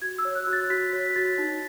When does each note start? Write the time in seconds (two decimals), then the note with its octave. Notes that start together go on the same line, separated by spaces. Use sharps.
0.02 F#4 G#6
0.18 E6
0.25 C#5
0.35 F#6
0.47 F#4
0.53 A6
0.70 F#4 B6
0.93 C#5 B6
1.16 F#4 A6
1.38 D#4